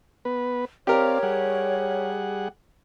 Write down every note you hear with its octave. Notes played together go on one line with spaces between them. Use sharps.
B3 B4
C4 G4 A#4 C#5 D5 F5
G3 G#4 F#5